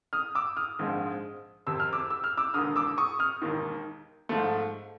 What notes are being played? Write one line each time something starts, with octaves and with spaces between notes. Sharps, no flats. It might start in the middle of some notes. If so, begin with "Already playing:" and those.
D#6 F6
D6 E6
D#6 F6
A#1 G#2 F3 G#3 C4
F#1 F2 C3 E6
F6
D6 E6
E6
F6
D6 E6
E1 D#2 D3 D#6 F6
D6 E6
C#6 D#6
D#6 F6
E1 D#2 D#3
G#2 F3 A3